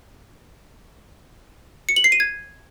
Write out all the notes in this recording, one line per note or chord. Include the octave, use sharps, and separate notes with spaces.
C#7
F#7
C7
D#7
G#6